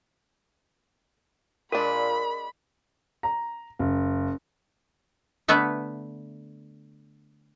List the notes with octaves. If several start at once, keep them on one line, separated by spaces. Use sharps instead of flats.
A#2 G#3 D4 A#4 B5
A#5
F#1
D3 A3 B3 B4 E5